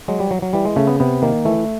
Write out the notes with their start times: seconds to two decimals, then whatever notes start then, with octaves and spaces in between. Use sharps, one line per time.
0.08 F#3 G#3
0.20 G3
0.31 F#3
0.42 F#3
0.53 E3 G3
0.65 G#3
0.76 C#3 A3
0.87 B3
1.00 C3 B3
1.22 D#3 A#3
1.45 E3 A3